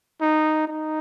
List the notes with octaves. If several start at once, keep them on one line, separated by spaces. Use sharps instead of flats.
D#4
D#4